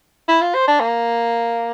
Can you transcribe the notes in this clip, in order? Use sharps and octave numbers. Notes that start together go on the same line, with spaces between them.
E4
F4
C5
D4
A#3